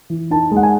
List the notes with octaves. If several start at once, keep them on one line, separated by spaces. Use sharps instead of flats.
E3
D#4 A5
G#3
F#5
G#5